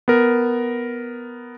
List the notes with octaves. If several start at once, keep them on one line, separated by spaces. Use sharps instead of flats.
B3 A#4